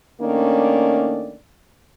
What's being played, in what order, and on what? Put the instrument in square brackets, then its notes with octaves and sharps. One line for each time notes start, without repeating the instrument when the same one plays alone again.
[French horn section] D#3 A3 A#3 C#4 D4 D5